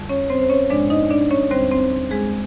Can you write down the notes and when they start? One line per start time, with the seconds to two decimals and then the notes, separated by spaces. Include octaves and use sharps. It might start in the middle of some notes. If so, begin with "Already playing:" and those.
Already playing: F2 D3 G3
0.09 C#4 C#5
0.30 C4 C5
0.41 C5
0.50 C#4 C#5
0.70 G#2 F3 G#3 D4 D5
0.90 D#4 D#5
1.11 D4 D5
1.30 C#4 C#5
1.51 D#2 D3 G3 C4 C5
1.71 C4 C5
2.11 G#3 G#4